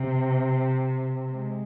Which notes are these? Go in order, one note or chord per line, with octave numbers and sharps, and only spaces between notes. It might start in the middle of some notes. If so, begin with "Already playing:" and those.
Already playing: C3
G#3